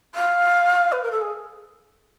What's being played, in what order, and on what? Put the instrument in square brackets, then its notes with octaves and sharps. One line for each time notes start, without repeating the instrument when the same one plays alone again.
[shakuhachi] F5
B4
A#4
A4
G#4